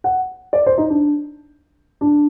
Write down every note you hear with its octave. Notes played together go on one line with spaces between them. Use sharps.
F#5
D5
C5
D#4
D4
D4